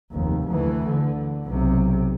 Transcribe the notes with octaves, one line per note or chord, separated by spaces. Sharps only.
F1 D#2
D2 E3
D3
B1 C3